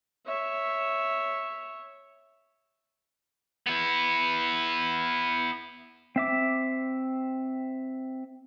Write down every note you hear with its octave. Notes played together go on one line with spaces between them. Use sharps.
C#5 E5
B3 E4
C4 E5 D6